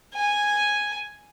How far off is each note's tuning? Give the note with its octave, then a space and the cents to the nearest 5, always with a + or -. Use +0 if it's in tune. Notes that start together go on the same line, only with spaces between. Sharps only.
G#5 -5